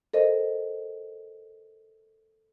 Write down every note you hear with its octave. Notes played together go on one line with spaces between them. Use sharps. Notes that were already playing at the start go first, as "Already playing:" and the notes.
A4 A#4 C5 D#5